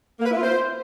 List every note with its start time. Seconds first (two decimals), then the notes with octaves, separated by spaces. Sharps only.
0.19 A#3
0.25 B4
0.31 E4
0.37 F4
0.43 C5